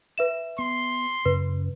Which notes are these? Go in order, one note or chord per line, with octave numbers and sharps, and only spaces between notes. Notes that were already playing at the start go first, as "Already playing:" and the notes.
B4 E5 E7
B3 C6
F#2 C#3 B4